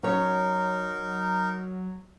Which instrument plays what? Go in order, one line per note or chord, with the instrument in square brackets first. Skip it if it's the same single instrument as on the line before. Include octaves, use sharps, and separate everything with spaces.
[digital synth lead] F#3 [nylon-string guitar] C#4 C#5 [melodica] D#4 A#4